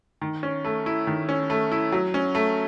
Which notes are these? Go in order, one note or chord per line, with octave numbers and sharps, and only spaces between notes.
D#3
C#4
A3
E4
D#3
C#4
A3
E4
F#3
C#4
A3